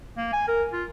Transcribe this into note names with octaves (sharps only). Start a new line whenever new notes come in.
A#3
G#5
A#4
F4